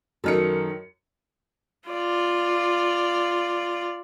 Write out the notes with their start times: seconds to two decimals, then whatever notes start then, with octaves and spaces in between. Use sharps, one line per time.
0.24 F#2 D#3 D#4 A4 F6 C#7
1.89 F4 D5